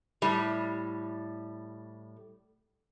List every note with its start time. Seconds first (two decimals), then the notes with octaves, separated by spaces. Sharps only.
0.22 A2 G3